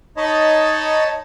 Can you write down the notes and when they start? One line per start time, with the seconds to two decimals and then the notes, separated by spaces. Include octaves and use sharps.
0.17 D#4 C#5 D#5 A5 B5